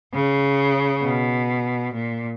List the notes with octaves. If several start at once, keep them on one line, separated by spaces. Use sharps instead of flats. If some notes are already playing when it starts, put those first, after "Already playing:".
C#3
B2
A#2